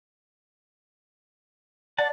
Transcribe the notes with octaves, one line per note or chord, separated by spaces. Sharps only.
D5 F#5 A5